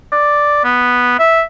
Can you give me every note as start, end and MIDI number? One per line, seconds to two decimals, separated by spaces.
0.12 0.62 74
0.65 1.17 59
1.19 1.43 76